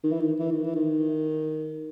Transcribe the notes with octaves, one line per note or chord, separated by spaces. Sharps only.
D#3
E3
D#3
E3
D#3
E3
D#3